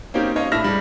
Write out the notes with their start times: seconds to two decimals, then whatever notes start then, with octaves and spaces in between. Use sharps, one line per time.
0.14 A#3 C4 C#4 D#4 G4
0.36 C#4 C#5 D#5 F5
0.52 A2 D4 E5 F6 A#6
0.64 G3 G#3